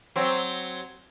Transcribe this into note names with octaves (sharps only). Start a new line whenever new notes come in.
F#3 C4